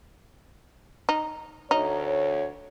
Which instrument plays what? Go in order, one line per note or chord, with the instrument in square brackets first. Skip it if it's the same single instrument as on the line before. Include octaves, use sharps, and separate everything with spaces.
[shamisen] D#4
[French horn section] D2 C#5 [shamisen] D#4